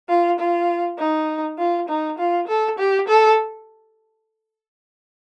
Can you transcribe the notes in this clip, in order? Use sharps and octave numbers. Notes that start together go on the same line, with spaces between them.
F4
F4
D#4
F4
D#4
F4
A4
G4
A4